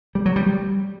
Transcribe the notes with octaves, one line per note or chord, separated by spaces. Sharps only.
G3
F#3
G3
G3